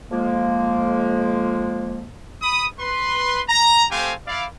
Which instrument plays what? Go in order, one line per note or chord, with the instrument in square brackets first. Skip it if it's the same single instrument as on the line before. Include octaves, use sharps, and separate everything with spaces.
[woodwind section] F2 F3 G#3 A#3
[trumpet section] B5 D#6
B4 C6
A#5
A3 C4 G4 C5 F5 G#5
E4 D5 F5